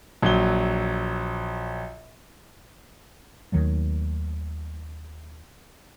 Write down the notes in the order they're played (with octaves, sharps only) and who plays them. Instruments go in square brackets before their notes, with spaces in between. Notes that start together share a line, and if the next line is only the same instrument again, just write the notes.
[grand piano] A#1 F#3 G7
[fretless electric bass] D#2 D#3 F#3 A3